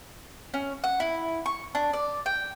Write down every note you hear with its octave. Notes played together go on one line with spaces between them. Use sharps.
C#4
F#5
E4
C#6
D4
D5
G5